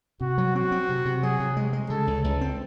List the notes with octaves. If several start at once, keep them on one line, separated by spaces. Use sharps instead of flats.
C3 F#4
F#3
C4 F#4
C4
C3
C3
F#3 G#4
C3
G#3
G#3
C#3 A4
C#2
C#2
C4